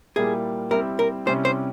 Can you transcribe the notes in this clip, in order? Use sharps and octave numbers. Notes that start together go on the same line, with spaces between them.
A#2 G3 A#3 E4 G#4
G3 C4 E4 A#4
A#4
C3 G3 C#4 E4 C5
C5